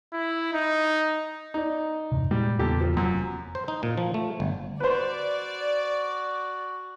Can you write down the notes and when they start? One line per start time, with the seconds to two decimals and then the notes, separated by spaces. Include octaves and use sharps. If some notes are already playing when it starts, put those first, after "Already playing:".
0.13 E4
0.53 D#4
1.54 D#4 D5
2.12 E2 G2 C3
2.31 A#2 G3 G#3
2.59 E2 A#2 C#3 B3 G4 A4
2.81 F3
2.97 F1 F#2
3.55 C5
3.68 D#4
3.83 A#2
3.98 F3
4.14 A3
4.40 G1
4.80 F#4 B4 C5 D5